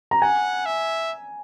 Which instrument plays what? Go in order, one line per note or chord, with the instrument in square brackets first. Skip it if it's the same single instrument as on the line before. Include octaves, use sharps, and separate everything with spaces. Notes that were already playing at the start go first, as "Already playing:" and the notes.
[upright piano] A#5
[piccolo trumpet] F#5 [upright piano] G#5
[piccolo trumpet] E5